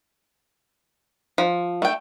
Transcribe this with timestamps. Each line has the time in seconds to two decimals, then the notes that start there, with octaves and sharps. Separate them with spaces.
1.38 F3
1.82 A3 G5